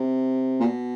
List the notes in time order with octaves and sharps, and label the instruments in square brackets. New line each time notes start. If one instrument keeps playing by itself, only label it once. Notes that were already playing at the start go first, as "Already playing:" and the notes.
Already playing: [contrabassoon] C3
A#2
B2